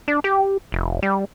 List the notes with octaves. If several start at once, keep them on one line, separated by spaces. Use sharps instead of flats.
D4
G4
F1
G3